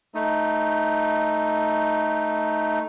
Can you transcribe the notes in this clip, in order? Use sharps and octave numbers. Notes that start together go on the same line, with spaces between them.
A3 D#4